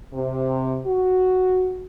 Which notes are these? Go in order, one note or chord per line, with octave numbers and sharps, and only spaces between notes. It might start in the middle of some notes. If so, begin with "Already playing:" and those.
C3
F#4